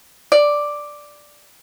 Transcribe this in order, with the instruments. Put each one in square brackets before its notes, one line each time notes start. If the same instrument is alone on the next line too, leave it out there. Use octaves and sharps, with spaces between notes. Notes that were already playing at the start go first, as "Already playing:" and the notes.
[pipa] D5